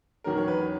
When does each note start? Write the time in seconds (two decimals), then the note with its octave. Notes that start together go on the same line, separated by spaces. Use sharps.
0.24 E2 D#3 F#3 C#4 A#4
0.37 C#5
0.48 B4